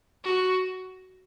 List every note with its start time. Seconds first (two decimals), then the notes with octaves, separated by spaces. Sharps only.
0.24 F#4